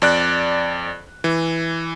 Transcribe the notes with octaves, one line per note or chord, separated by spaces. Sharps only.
F2 D5 F#6
E3